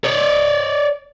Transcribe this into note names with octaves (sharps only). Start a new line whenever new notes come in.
C#5 D5